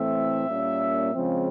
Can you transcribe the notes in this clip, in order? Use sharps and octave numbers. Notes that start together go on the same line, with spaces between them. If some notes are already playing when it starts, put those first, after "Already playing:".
Already playing: A2 E3 A3 C4 E5
A#2 G3 A#3 C#4
C#3 F3 G#3 C4